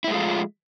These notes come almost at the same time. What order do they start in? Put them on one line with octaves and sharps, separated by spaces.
E4 A3 G#3 F4 F3